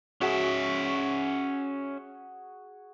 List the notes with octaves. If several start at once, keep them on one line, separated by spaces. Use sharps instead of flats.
C#4 F#4 G#4 E5